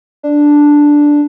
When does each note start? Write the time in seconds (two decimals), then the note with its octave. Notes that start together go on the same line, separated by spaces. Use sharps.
0.23 D4